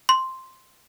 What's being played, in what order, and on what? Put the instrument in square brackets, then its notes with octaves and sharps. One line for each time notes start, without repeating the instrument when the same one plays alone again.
[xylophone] C6